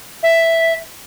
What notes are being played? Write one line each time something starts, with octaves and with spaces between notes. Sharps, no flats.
E5